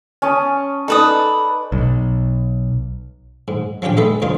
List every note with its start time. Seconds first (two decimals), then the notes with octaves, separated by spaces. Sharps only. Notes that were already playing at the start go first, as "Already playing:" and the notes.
0.22 C#4 A5 D#6
0.88 D#4 A4 B4 D5 D#6
1.72 B1
3.48 G#2
3.82 F3 C#4 D4 G4 G5
3.97 G#3 A3 D#4 A4 B4
4.22 C2 G2 G3 C4 D#4 F4